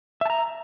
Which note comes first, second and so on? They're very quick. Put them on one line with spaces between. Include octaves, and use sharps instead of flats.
E5 A5 A#5